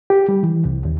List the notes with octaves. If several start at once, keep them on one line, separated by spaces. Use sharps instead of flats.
G4
G3
E3
C2
D#2